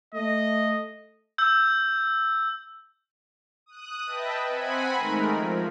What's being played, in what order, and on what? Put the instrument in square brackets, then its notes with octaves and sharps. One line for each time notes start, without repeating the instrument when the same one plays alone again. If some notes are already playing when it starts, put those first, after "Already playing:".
[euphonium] A3 [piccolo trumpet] D#5
[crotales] E6 G6
[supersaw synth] D#6 F#6
B4 D#5 E5 G5 A5
C4 F#5 G#5 B5
D#3 G#3 A3 A#4
F3